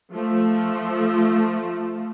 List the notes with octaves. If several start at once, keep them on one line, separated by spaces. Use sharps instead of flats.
F3 A3